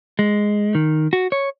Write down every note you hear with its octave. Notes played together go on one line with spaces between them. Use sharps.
G#3
D#3
F#4
C#5